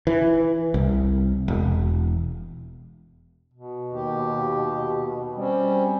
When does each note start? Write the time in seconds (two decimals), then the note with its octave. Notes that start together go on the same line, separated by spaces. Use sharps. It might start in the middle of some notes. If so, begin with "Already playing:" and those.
0.07 E3
0.74 C2
1.48 E1
3.54 B2
3.93 D#2 G4
5.37 G3 C4 C#4